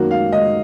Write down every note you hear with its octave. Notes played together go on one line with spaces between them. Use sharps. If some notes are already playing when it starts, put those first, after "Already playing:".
Already playing: F#2 D#3 A#3 F#4
F5
D#5